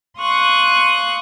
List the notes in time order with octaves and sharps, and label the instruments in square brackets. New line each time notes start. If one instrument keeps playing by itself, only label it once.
[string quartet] F5 C6 C#6 D#6 F#6